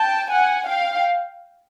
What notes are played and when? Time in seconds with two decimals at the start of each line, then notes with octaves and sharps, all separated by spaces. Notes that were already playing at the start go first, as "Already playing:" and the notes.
Already playing: G5 A5
0.30 F#5 G#5
0.66 F5 G5